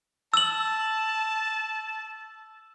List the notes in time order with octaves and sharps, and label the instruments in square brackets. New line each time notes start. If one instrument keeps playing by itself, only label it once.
[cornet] A5 [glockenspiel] E6 F#7